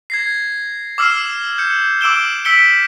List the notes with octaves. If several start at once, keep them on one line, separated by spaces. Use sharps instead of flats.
G#6 A#6 C7
D6 E6 F6 C7 E7
G6 C#7
D6 E6 D7 E7 G7
E6 B6 C#7 D7 G7